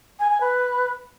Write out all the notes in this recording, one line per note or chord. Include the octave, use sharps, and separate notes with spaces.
G#5
G#5
B4